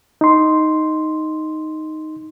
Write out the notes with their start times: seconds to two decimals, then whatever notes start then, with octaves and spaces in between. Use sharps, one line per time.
0.21 D#4 C6